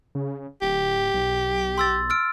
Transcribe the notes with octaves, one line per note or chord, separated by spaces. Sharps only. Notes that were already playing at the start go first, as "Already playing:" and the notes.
C#3
D1 G4
B1
C6 E6 A6
E6 F6 D7